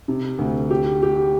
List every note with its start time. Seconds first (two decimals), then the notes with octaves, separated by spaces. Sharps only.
0.08 C3
0.38 D2
0.70 G4
1.02 G4